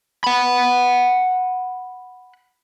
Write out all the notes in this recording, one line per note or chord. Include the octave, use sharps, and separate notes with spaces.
F#5 B5